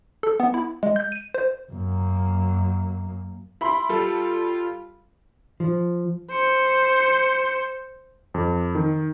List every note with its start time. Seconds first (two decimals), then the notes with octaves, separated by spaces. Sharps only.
0.23 A4
0.40 B3
0.54 E4
0.83 G#3
0.96 G6
1.12 D#7
1.34 C5
1.72 F#2 A#3
3.61 E4 B5 C6
3.89 G3 F4 A4
5.60 F3
6.31 C5 C#7
8.34 F2
8.75 D#3